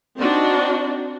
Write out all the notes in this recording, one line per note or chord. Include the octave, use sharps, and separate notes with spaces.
C4 D4 D#4 F#4